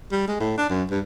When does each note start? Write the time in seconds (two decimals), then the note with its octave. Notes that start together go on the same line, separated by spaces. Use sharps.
0.12 G3
0.28 G#3
0.40 A2
0.58 D4
0.69 F#2
0.90 G2